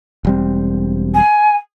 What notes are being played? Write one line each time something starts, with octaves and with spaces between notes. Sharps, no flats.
E1 G3 C4
G#5